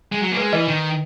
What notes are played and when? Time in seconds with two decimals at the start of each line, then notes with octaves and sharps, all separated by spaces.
0.12 G#3
0.22 F#3
0.32 A#3
0.37 G#3 B4
0.53 E3 B4 D#5
0.68 D#3